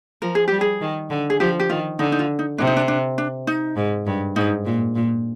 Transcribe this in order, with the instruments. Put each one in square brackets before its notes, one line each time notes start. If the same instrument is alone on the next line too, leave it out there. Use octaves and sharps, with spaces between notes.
[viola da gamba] F3 [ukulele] A#4
[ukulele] G#4
[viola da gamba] G3 [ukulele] G4
[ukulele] G#4
[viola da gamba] D#3
D3
[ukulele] G#4
[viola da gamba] F3 [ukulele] G4
[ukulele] G4
[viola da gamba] D#3 [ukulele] F4
[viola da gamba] D3 [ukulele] D#4
[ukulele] D#4
F4
D#4
[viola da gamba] C3 [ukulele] D4
[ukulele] D#4
D4
D4
D4
D#4
[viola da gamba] G#2
G2
[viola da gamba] G#2 [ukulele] D#4
[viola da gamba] A#2
A#2